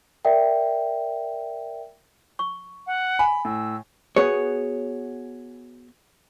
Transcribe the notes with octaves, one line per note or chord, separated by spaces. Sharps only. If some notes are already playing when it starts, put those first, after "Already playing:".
A#4 D5 E5 G5
C#6
F#5
G#5 B5
A2 E6
B3 F#4 G#4 C#5